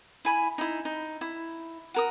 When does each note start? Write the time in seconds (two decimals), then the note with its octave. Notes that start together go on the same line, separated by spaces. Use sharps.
0.25 E4 G#5 B5
0.58 D#4 E4
0.85 D#4
1.21 E4
1.94 F#4 A#4 D#6